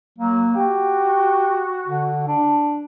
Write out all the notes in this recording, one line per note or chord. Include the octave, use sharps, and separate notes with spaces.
F#3 A#3
F#4 G4
D3
D4